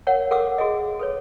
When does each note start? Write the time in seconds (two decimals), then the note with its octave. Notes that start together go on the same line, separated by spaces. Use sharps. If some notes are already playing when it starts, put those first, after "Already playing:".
0.07 A#4 C#5 F5 F#5
0.31 A4 A#4 F5 F#5 D6 E6
0.58 F#4 G#4 A4 D#5
0.99 A4 B4 C#5